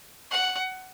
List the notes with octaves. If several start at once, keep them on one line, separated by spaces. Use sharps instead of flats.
F#5